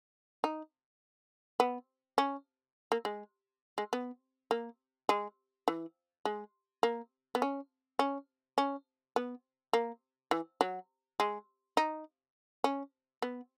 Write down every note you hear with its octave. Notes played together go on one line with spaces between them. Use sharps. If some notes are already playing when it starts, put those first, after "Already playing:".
D#4
B3
C#4
A#3
G#3
G#3
B3
A#3
G#3
E3
G#3
A#3
B3
C#4
C#4
C#4
B3
A#3
E3
F#3
G#3
D#4
C#4
B3